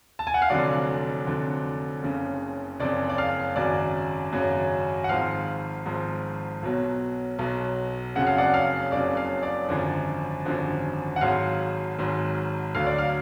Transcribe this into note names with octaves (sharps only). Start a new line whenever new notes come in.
A5
G#5
F#5
F5
F1 F2 D3 F#3 D5
F1 F2 D3 F#3
F#1 F2 C#3
F#1 F2 C#3 D5
D5
F5
G#1 F#2 C#3 F#3 D5
G#1 F#2 C#3 F#3
F#5
G#1 G#2 F3 F5
G#1 G#2 F3
B1 B2 F#3
B1 B2 F#3
F#1 F2 C#3 F#3 F#5
F5
D5 F#5
F5
F#1 F2 C#3 F#3 D5
F5
D5
G#1 F#2 D3 F3
G#1 F#2 D3 F3
F#5
G#1 G#2 F#3 F5
G#1 G#2 F#3
D2 D3 F#3 F5
D5
F5